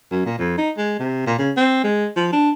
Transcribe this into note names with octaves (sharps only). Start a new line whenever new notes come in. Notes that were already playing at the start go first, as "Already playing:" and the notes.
F#2
A#2
F2
D#4
G#3
C3
A#2
C#3
C4
G#3
F3
D4